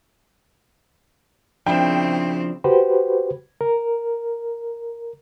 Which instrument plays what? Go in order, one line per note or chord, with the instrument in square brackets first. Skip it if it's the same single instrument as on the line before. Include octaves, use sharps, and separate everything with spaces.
[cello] C#3 C4 [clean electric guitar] F3 D4 E4 [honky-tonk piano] G5
[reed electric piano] F#4 G4 B4 C5
A#4